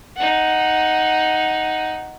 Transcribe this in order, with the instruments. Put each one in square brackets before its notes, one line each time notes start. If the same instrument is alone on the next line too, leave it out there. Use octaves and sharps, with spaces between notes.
[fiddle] D#4 F#5